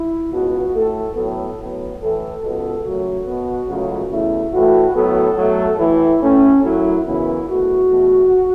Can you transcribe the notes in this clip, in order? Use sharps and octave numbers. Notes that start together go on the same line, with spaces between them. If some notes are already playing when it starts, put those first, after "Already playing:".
Already playing: E4
C#2 B2 B3 F#4
A2 A3 A4
A2 F#3 B3 A4
A2 F#3 B3
A2 E3 A3 A4
C#2 B2 B3 A4
F#2 C#3 F#3 A3 F#4
B2 B3
C#2 C#3 F#3 A3
E2 C#3 A3 E4
A2 E3 A3 F#4
A2 F#3 B3 A4
B2 F#3 A3
A2 E3 A3 E4
A2 A3 C#4
F#2 F#3 A3 E4
F#2 C#3 E3 B3 E4
E2 B2 A3 F#4
E2 B2 A3